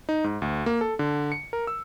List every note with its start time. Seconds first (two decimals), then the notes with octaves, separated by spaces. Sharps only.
0.09 D#4
0.24 G#2
0.42 D2
0.66 A#3
0.81 A4
0.99 D3
1.32 C#7
1.53 A#4
1.67 E6